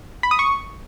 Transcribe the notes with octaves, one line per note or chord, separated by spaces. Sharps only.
B5
D#6
C#6